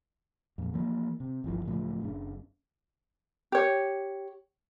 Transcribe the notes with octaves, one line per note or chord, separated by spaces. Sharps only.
F2 A#2
E3 F3 A#3
C3
G1 C2 E3 F3
C#2 A2 F3 F#3
F#1 C#3 D4
G4 C#5